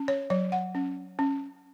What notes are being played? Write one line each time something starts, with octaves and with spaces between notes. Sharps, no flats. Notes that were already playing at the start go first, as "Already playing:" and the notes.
Already playing: C#4
C#5
F#3 C#5
F#5
C#4
C#4